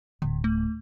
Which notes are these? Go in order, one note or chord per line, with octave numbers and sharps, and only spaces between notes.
D1 D3
A3